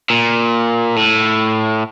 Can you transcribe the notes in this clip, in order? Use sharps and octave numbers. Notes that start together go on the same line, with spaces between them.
A#2
A2